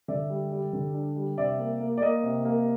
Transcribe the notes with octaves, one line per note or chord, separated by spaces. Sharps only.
D3 D5 E5
G3
G3
D3
D4
G3
C3 D5 E5
A#3
A#3
D5
A#3 D#5
C3
A#3